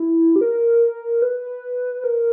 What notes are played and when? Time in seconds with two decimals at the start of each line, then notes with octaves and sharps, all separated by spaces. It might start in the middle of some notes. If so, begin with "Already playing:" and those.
Already playing: E4
0.36 G4
0.41 A#4
1.22 B4
2.04 A#4